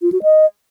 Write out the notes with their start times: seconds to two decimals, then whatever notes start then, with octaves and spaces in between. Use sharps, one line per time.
0.02 F4
0.12 F#4
0.23 D#5